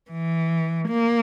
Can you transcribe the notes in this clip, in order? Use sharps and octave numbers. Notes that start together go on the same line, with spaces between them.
E3
A#3